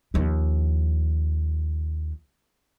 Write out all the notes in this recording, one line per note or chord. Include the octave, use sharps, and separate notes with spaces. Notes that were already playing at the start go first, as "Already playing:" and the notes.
D#2 F3